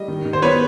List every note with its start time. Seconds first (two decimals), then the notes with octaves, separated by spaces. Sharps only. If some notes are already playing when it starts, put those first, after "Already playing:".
Already playing: G3 D#5
0.08 D#3
0.25 D#3
0.33 C5
0.42 B3 B4 C#5